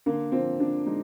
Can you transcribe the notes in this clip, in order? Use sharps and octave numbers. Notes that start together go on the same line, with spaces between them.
D3 A#3
F3 C4
D3 D4
G#3 D#4